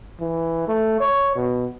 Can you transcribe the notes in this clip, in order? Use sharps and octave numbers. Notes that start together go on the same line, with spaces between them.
E3
A3
C#5
B2